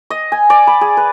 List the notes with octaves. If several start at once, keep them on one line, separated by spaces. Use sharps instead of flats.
D#5
G#5
D5
B5
G#4
B4